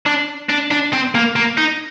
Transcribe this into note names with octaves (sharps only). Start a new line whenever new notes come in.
D4
D4
D4
C4
A#3
A#3
D#4